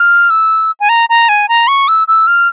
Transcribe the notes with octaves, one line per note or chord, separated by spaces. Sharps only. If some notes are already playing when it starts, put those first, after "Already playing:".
Already playing: F6
E6
G#5
A#5
A#5
G#5
A#5
C#6
E6
E6
F6